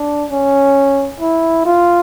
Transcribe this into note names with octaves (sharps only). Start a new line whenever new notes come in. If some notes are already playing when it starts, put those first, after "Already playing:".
Already playing: D4
C#4
E4
F4